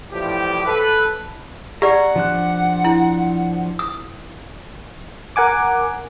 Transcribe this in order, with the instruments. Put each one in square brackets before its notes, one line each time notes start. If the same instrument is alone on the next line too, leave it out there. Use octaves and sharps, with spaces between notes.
[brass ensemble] A2 E3 F3 G3 G4
A4 B4
[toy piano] G4 D5 [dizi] F#5 [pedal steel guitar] A#5
[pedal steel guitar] F3 D4 F#6
[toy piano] E4
D#6
[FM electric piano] A#4 F#5 G#5 D6